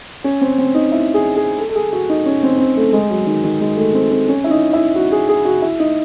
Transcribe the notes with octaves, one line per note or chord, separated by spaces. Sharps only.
C#4
C4
C4
D#4
E4
G#4
G#4
A4
A4
G#4
F#4
D#4
C#4
C4
C#4
C4
A3
G#3
F#3
D#3
D#3
G#3
A3
C4
C4
C#4
E4
D#4
E4
F#4
G#4
G#4
F#4
E4
D#4